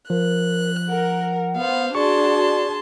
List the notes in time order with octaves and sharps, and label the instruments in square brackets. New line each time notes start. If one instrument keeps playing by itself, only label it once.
[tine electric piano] F3 [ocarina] A#4 [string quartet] F#6
[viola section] A#4 [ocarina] F#5
[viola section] B3 C5 [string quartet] F5
[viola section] D4 F#4 [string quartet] G#4 A5 C6 [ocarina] D5 [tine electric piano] C#6